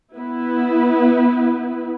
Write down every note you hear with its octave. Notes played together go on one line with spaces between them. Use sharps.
B3 E4 B4